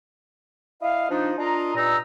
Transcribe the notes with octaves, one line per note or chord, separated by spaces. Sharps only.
E4 D#5 F5
F3 D4 D#4
D4 F4 A#4 D#5 A#5
G2 A#2 D#4 A#5 E6